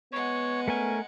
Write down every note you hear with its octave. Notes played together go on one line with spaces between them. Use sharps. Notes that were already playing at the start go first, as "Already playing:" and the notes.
G#3 B3 C#5 F#5
A3 C#4 A#4 G#5